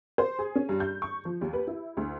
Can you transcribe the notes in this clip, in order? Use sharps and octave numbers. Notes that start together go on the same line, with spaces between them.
C5
G#4
C#4
G2
G6
C#6
F3
D#2
B4
E4
D2